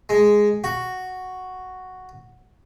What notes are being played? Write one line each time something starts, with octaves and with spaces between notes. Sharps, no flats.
G#3
F#4